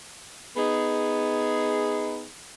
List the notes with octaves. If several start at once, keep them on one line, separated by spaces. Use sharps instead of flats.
B3 D#4 G#4